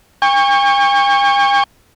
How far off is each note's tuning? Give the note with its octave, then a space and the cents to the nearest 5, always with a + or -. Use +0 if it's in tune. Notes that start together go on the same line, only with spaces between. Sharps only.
G5 +45 C#6 +0